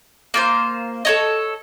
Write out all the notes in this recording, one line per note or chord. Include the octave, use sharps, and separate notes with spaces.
A#3 F4 C5
A4 C#5 D#5